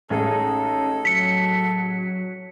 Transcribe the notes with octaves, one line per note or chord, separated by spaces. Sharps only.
A1 G#3 C#4 D#4 G#4 A4
F#3 B6 C#7